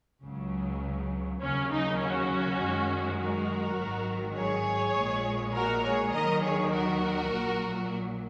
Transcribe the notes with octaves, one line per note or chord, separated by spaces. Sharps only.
C#2 C#3 F#3
D#2 C#3 F#3 C#4
D#4
C#4 F#4
F#2 D#3 G#3
F#4 A#4
G#1 G#2 D#3 F#3
G#4 C#5
A#1 A#2 G#3
F#4 A#4
G#4 C#5
D#2 D#3 F#3 A#4 D#5
G#4 C#5
F#4 A#4
A#1 A#2 F#3